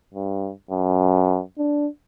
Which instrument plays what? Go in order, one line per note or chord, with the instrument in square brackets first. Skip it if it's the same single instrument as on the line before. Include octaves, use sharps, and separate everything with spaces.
[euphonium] G2
F#2
D4